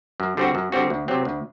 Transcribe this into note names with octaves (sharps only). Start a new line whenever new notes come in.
F#2
D3 G3 C4 F#4
F#2
D3 G3 C4 F#4
D2
C3 F#3 C4
D2